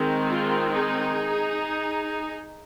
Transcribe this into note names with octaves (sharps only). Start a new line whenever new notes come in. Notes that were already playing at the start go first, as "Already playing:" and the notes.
Already playing: D#3 G#3 C4
F4
D#4 G#4